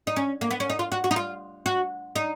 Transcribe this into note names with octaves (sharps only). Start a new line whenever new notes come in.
D#4
C#4
A#3
B3
C#4
D#4
F4
F#4
F#4
D#4
F4
F#4
D#4